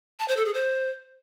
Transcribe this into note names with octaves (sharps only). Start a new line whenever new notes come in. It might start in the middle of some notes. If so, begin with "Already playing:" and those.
A5
C5
A4
G#4
C5